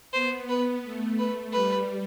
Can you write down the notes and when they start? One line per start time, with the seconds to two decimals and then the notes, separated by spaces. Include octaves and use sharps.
0.13 B3 C5
0.49 B4
0.83 A3
1.19 B4
1.53 G3 B4